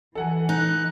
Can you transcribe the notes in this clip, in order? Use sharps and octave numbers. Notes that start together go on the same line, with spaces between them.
E3 A4 F#5 G#5
D#4 F#6